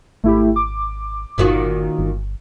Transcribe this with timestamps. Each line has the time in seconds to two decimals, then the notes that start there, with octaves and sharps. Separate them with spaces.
0.24 G#1 A3 E4 G4
0.56 D6
1.38 G1 A#2 D#3 F#4
1.99 G1